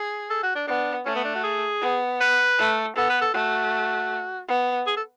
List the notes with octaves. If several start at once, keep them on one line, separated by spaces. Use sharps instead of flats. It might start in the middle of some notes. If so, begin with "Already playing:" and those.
Already playing: G#4
A4
F#4
D4
B3 D4
A3 C#4
B3
D4
F#4
G#4
B3
B4
A3
B3 A4
B4
A4
A3 F#4
B3
G#4
A4